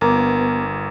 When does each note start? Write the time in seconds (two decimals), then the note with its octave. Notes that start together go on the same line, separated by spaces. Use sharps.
0.01 G1 A#3 B3 A#4 D6